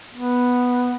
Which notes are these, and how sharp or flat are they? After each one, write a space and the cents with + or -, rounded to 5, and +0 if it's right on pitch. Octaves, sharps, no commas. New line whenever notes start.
B3 +0